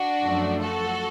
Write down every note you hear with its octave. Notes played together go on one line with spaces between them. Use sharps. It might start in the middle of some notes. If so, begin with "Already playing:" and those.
Already playing: D4 F#4
F#2 F3 A3
F#4 A4